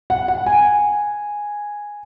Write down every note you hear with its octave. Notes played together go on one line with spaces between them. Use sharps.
F#5
F#5
G#5